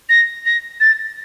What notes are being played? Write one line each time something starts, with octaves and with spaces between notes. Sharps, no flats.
A#6
A#6
A6